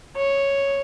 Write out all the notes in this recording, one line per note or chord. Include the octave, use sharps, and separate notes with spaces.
C#5